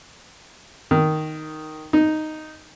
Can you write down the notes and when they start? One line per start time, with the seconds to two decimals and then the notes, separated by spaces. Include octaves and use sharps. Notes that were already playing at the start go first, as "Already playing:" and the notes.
0.91 D#3
1.93 D#4